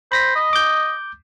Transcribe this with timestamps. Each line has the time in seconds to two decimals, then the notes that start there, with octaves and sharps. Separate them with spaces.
0.12 C5 B5 A#6 B6
0.35 D#5
0.53 D6 G6